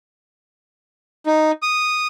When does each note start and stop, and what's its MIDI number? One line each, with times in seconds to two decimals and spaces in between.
1.26 1.51 63
1.62 2.08 87